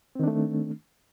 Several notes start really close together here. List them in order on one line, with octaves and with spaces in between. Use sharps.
C4 D#3 D4 A3